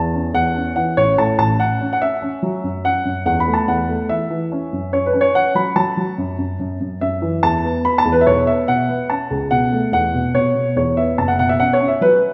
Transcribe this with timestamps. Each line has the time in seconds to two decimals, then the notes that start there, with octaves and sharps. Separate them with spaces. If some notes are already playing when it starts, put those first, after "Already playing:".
Already playing: E2 A5
0.14 C#4
0.34 E2 F#5
0.56 C#4
0.76 E3 F#5
0.97 A1 C#5
1.18 A2 A5
1.38 A1 A5
1.59 C#4 F#5
1.81 C#4
1.93 F#5
2.01 C#4 E5
2.22 C#4
2.43 F#3
2.64 F#2
2.84 C#4 F#5
3.05 F#2
3.26 E2 F#5
3.40 B5
3.48 A3
3.54 A5
3.68 E2 F#5
3.89 A3
4.09 E3 E5
4.30 E3
4.52 C#4
4.73 F#2
4.92 C#4 C#5
5.06 B4
5.13 C#4
5.21 C#5
5.34 C#4 F#5
5.55 F#3 B5
5.76 F#3 A5
5.97 F#3
6.18 F#2
6.38 F#2
6.59 F#2
6.81 F#2
7.01 F#2 E5
7.22 E3
7.43 E2 A5
7.64 B3
7.85 B3 B5
7.98 A5
8.05 E2
8.12 B4
8.21 E5
8.26 B1 C#5
8.47 B3 E5
8.68 B2 F#5
8.89 B3
9.10 C#4 A5
9.31 C#2
9.51 B2 F#5
9.72 A3
9.92 E2 F#5
10.14 B2
10.34 B2 C#5
10.55 B2
10.76 E2 C#5
10.97 B3 E5
11.18 F#1 A5
11.28 F#5
11.39 B2 F#5
11.49 E5
11.60 C#4 F#5
11.73 C#5
11.80 C#4
11.88 E5
12.01 F#3 B4